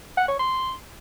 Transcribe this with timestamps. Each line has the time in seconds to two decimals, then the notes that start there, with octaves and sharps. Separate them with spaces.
0.17 F#5
0.28 C#5
0.39 C6